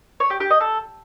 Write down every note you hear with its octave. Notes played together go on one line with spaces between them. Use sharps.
C#5
G4
G4
D#5
A4